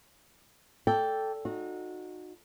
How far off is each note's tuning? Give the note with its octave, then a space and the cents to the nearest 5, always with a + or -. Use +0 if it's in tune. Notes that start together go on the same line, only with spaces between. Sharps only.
A4 +0 D5 -25 G5 +0
D#4 -15 F#4 -25